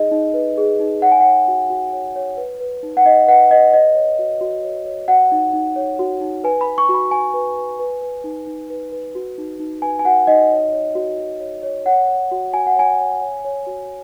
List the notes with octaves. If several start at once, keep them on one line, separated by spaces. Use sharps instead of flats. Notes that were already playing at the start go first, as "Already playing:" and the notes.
Already playing: D#4 G#4 D#5
D#4
B4
G#4
D#4
C#5 F#5
G#5
C#5 F#5
F#4
F#4
C#5
C#5
B4
B4
D#4
F#5
D#4 D#5
B4 F#5
B4 D#5
C#5 D#5
C#5
F#4
F#4
C#5
C#5
F#4 F#5
D#4
D#4
C#5
F#4
D#4
B4 G#5
B5
B4
C#6
F#4
B5
F#4 G#5
B4
B4
B4
B4
D#4
D#4
B4
B4
F#4
D#4
D#4
B4 G#5
G#5
F#4 F#5
D#4 D#5
C#5
C#5
F#4
F#4
C#5
C#5
C#5 F#5
C#5
F#4
F#4 G#5
F#5
C#5 G#5
C#5
C#5
C#5
F#4